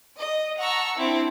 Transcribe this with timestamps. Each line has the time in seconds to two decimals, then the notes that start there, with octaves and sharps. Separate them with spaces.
0.19 D#5
0.59 F#5 A5 A#5 C#6 E6
0.98 C4 D4 E4